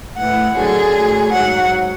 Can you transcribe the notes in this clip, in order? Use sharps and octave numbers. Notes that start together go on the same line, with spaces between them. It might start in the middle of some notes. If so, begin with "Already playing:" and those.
A2 E3 F#5
F#2 D3 F#3 G#4
A2 F#3
G#2 F#3 F#5